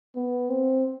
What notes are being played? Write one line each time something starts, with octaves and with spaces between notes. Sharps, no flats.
B3
C4